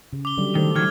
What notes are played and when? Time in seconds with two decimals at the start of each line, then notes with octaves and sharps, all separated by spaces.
0.13 C#3
0.25 D6 G7
0.38 D3 F#3 G3
0.55 D#3 A3 A4 C5
0.75 D#3 F#3 F6 G#6